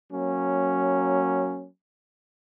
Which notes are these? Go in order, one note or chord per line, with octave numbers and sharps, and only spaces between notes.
F#3 A#3 C#4